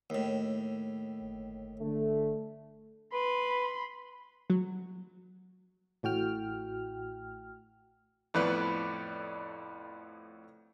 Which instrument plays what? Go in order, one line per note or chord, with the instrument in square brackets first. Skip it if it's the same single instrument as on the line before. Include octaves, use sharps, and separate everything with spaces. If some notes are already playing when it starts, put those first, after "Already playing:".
[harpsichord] D#2 A2
[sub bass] G1
[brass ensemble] D3 A3
[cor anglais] B4 [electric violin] B5 C6
[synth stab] F#3
[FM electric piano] A1 A2 F#4 G5 F6
[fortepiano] F2 A2 B3 B4 D5